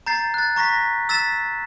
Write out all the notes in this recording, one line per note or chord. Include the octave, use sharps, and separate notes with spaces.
A#5 G6 A6 C7
F#6 A6
A#5 C#6 A#6 B6
E6 A6 B6 E7